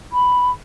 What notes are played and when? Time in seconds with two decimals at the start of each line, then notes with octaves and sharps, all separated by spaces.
0.12 B5